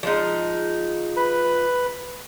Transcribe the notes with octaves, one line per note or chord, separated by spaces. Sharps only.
F3 G#3 D#4
B4 B5